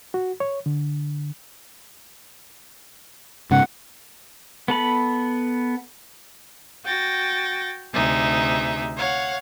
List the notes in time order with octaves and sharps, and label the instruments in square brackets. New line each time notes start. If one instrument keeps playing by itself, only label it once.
[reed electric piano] F#4
C#5
D3
[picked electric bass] G#2 C#3 [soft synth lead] F#5
[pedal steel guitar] B3 A4 B5
[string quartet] F#4 G5 A6 A#6
D2 C3 D#4 G#4 E5
C#5 F5 F#5